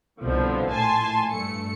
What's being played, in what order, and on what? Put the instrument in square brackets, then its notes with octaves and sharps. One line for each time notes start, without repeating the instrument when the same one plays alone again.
[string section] C2 B2 D3 F3
A#1 A2 G#5 A5 C6
G2 A3 C#7